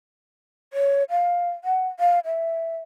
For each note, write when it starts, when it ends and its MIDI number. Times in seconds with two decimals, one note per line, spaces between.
0.73 1.04 73
1.10 1.50 77
1.64 1.88 78
2.00 2.19 77
2.25 2.79 76